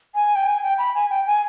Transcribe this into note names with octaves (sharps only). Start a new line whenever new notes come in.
G#5
G5
G#5
G5
B5
G#5
G5
G#5